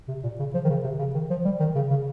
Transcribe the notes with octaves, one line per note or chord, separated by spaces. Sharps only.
C3
A#2
C#3
F3
D#3
C#3
C3
C#3
D#3
F3
G3
D#3
C#3
C#3